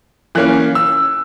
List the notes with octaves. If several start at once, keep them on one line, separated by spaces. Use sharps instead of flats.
E3 A#3 C#4 F#6
E6